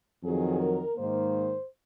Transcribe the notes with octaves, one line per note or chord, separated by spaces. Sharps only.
F2 D#3 F#3 G#4
A#4
G#2 D#3 A#3 C5